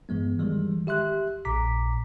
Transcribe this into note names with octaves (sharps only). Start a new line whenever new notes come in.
G2 E3 G#3 B3
D#3 E3 G3 G#3
G4 E5 C6 F#6
A#1 A#2 A#5 D6 B6